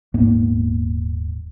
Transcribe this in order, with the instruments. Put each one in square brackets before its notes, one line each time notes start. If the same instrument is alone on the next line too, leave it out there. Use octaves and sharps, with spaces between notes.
[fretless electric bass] D#1 G#2 A#3 B3